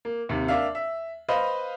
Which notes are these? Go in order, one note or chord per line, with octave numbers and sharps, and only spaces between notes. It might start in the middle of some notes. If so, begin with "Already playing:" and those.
A#3
D#2 C3
A#3 D4 E5 F5
E5
B4 C5 D#5 F5